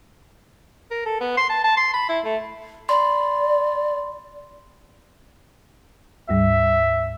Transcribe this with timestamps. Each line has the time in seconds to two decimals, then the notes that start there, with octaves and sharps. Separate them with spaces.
0.91 A#4
1.06 A4
1.20 B3
1.37 C6
1.50 A5
1.64 A5
1.77 C6
1.94 B5
2.09 E4
2.24 A3
2.89 D5 B5 C6
6.29 D2 G#2 G3 E5